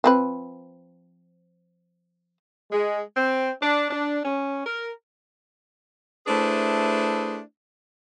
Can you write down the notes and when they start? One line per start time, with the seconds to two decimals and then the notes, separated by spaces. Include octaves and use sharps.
0.04 F3 C4 B4
2.71 G#3
3.17 C4
3.60 D4
3.91 D4
4.24 C#4
4.66 A#4
6.27 A3 D4 E4 G#4 B4 C5